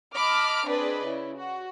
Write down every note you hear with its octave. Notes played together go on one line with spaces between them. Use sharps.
D#5 A5 B5 D6 F6
C4 D4 G#4 B4 D5 D#5
C#3 E4
F#4